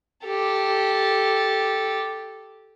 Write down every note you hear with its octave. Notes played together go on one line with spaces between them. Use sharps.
G4 A4